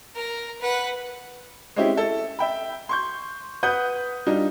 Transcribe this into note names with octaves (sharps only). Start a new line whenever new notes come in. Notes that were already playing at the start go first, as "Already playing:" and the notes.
A#4 A#5
B4 F#5
G#3 C4 C#4 E4 G4
E4 A4
E5 G5 B5
C6 C#6 G6
B4 F#5 D#6 G6
G3 D4 D#4 F4